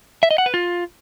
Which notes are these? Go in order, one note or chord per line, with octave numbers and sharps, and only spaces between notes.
E5
D#5
F#5
B4
F4